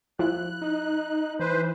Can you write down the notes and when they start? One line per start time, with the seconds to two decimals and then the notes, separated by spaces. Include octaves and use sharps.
0.19 F3 E4 F#6
0.62 D#4
1.40 E3 B4 C5